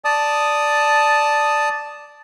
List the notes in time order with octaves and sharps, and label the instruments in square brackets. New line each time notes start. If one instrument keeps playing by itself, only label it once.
[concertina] D5 A5 D#6